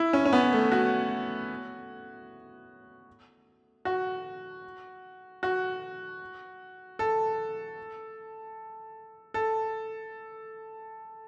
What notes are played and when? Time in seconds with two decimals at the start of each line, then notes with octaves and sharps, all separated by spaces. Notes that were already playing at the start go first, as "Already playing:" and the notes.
Already playing: E4
0.13 C#4
0.25 C#4
0.33 B3
0.53 A3
0.72 F#4
3.85 F#4
5.43 F#4
6.99 A4
9.34 A4